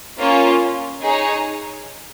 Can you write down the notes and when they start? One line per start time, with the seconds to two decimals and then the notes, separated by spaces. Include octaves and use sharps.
0.19 A#3 C#4 F4
1.02 D#4 G#4 C#5